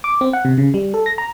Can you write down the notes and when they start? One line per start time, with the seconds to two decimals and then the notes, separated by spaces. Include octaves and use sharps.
0.04 D6
0.21 C4
0.33 F#5
0.45 C3
0.58 C#3
0.74 G3
0.94 A4
1.06 A#6
1.18 A#5